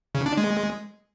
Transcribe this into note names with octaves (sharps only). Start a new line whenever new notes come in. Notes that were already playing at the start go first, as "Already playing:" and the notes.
C#3
D4
G#3